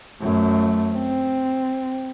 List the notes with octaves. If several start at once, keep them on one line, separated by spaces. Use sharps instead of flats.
F#2 A3
C4